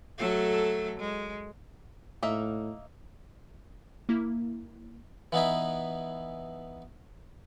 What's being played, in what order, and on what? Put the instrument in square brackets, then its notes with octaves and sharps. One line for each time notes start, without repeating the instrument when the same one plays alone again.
[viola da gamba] F#3 A3 A4
G#3
[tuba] A2 [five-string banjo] A#3 D#4 E5
[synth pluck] A#3 E4
[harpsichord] E3 B3 D#4 E4